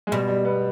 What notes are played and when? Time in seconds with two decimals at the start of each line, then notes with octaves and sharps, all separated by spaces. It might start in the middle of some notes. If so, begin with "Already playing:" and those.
0.07 G#3
0.12 B2 G3
0.28 G3
0.45 B3